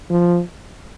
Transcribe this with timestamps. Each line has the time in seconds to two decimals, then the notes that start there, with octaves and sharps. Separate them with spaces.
0.10 F3